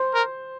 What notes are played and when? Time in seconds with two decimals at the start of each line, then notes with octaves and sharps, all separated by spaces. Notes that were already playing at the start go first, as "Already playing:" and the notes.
Already playing: C5
0.14 A#4